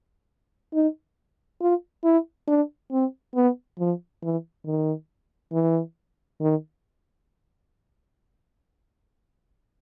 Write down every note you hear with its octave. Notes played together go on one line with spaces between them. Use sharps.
D#4
F4
E4
D4
C4
B3
F3
E3
D#3
E3
D#3